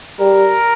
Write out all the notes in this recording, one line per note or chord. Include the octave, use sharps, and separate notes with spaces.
G3 A#4